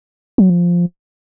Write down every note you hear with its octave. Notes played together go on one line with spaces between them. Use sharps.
F#3
F3